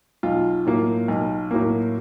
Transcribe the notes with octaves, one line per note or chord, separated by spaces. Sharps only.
B1 F4
A2 F#3 A#3
B1
A2 F#3 A#3